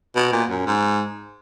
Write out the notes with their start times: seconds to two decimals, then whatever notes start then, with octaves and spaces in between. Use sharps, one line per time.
0.16 B2
0.32 A#2
0.49 F#2
0.67 G#2